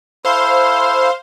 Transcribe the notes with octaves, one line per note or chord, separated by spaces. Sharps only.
E4 A4 C5 F5 C6